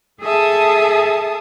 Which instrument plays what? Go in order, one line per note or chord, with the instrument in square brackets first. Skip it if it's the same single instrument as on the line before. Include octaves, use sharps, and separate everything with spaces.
[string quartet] G#4 A4 E5 A5 D#6